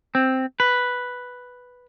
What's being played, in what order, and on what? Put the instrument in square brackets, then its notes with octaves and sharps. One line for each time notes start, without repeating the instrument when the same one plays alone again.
[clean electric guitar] C4
B4